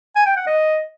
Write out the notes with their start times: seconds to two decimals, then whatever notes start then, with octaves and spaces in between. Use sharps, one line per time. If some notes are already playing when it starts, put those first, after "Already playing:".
0.16 G#5
0.26 G5
0.37 F#5
0.47 D#5